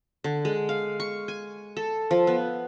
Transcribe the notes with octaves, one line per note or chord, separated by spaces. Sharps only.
D3
G#3
F5
C#6
G#5
A4
F3
B3